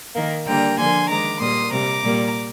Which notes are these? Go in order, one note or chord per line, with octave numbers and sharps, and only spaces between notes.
D#3 A#3
D3 G3 A#3 G5 A#5
D3 F3 A#3 G#5 C6
D#3 G#3 A#5 D6
A#2 G3 A#3 C6 D#6
C3 G3 A#3 A#5 D6
A#2 G3 A#3